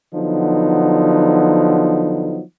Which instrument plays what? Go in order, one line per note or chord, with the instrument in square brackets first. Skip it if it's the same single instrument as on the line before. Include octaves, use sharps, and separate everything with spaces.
[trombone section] D3 F3 F#3 B3 D#4